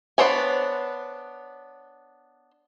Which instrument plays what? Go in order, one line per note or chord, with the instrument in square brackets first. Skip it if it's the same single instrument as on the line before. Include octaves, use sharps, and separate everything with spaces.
[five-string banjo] B3 D4 C5 C#5 G#5